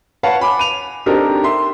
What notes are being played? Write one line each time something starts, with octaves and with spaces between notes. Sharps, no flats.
B4 C#5 F5 F#5 A5
G#5 B5 D6
D#7 F7
C4 D4 D#4 G4 A4 A#4
E5 C6